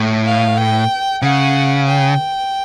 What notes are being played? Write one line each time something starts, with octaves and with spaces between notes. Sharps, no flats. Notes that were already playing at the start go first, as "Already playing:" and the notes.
Already playing: A2
F5
G5
C#3 F#5
G5